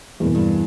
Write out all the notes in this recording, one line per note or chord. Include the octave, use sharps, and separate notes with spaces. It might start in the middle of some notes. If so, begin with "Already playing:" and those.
E2 G2 B2 A#3
G2